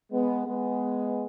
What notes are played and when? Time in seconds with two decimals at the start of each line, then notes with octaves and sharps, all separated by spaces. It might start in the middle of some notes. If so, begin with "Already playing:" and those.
0.10 G#3 B3
0.47 G#3 B3